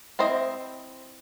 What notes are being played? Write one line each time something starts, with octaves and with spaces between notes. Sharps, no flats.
C4 E4 C5 D#5